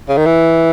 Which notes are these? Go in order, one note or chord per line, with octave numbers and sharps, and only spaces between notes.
C#3
D#3
E3